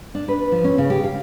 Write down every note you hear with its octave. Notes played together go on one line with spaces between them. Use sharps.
D4
B4
F3
C#4
C#3
G4
F5